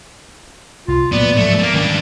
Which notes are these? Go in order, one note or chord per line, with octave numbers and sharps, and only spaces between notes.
C2 F4
A#2 F#3 A3 B3 D5
G#2 F3 F#3 A3
A3 A#3
D#3 G3 C#4 D4